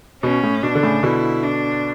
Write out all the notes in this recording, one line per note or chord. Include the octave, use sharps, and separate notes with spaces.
B2 C#4
A2
B2 D4
D3
A2 C#3
B2 D3 E4
D4